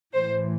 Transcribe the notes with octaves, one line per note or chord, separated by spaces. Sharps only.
A1 A2 E3 C5